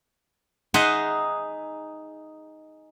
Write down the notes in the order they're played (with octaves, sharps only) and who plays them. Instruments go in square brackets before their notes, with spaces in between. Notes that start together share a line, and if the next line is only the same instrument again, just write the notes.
[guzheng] D#4 G#4 D#5 E5 F#5 C6